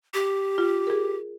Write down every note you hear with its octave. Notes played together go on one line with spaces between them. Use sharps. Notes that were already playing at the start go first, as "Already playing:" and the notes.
G4
F4
G#4 A#4